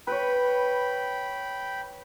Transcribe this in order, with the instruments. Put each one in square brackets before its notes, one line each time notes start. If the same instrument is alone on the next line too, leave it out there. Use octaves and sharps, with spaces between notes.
[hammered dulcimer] B4 C#5 [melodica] G5 B5